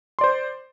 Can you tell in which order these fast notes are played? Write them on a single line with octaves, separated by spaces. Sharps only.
C6 D5 C5